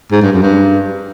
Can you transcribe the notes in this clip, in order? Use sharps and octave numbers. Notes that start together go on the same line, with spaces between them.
G#2
G2
F#2
G2